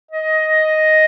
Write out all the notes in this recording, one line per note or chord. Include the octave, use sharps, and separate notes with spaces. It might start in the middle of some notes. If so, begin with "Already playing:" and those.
D#5